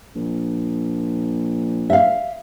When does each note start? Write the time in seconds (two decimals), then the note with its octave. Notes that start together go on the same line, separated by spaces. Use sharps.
0.15 A#1
1.90 E5 F5